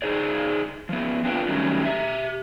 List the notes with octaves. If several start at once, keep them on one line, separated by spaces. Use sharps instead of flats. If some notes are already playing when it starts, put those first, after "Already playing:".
D#4 G#4 C5 D5
F3 B3
C4 D4 F4 B4 G5
D#3 F#3 G3 A3 C#4 D#4
G4 E5